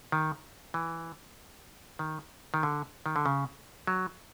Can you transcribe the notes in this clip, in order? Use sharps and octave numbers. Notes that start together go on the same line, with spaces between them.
D#3
E3
D#3
D#3
D3
D#3
D3
C#3
F#3